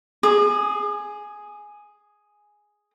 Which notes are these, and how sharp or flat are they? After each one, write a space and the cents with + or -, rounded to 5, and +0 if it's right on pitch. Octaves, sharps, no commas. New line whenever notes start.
G#4 +0 D#6 -45